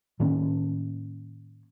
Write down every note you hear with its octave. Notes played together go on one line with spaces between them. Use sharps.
A2 D#3 A#3 C#4